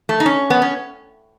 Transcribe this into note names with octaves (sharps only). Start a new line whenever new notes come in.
A3
D#4
C#4
B3
C#4